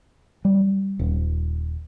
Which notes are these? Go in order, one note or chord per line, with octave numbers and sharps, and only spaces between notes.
G3
D#1